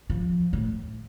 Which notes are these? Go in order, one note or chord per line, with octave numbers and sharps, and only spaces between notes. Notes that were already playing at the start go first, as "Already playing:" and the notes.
F3
A2